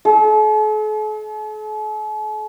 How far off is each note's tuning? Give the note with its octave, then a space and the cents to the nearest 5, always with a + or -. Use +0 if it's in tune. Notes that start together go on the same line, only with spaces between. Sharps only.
A4 -45